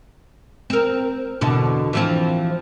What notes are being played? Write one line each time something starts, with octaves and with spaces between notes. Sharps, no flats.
C4 A#4
E2 B2 D3
E3 F3 C4